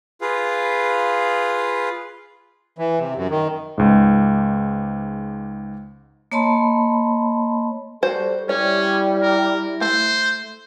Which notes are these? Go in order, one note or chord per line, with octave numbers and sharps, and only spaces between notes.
F4 G#4 B4 F5
E3
C3
F#2
D#3
C#2 G#2
A#3 C#5 D#5 A5 B5 C6
G3 F#4 A4 C5
G3 C#4 E4 C#5
A#4
A3 C5